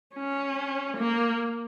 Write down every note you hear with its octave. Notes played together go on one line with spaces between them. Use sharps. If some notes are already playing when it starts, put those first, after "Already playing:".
C#4
A#3